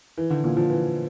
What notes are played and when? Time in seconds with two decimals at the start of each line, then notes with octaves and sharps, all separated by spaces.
0.18 E3
0.30 D3
0.44 A#2
0.57 F3
0.70 E3